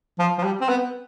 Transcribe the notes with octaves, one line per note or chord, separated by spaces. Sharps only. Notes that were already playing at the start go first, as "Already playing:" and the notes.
F3
F3
G3
C4
B3